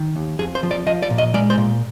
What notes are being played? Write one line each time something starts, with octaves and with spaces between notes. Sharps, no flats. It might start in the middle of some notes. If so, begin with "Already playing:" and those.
Already playing: D#3
D#2
F2 G#4
C5
F3
D5
F3 D#5
D5
A#2
D#5
G#3 D5
C5
A#2